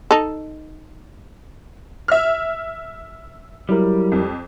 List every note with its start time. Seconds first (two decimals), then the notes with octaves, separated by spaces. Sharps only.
0.11 D#4 A4
2.08 E5 F6
3.69 F#3 G3 E4 A#4
4.12 F2